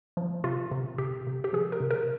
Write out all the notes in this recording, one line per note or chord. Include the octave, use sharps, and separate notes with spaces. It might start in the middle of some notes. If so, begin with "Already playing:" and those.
F3
C3 F4
C3
C3 G4
C3
G4
F3 G#4
A#4
C3
A#4